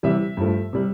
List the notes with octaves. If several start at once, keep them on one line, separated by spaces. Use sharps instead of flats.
C3 E3 G3 E5
G2 F3 A3
C3 G3